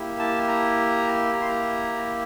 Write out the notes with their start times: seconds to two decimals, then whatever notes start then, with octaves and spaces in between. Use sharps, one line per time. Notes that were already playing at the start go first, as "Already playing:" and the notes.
Already playing: A#3 E4 G4
0.19 A5
0.48 A#5
1.34 A#5
1.41 C6
1.49 A#5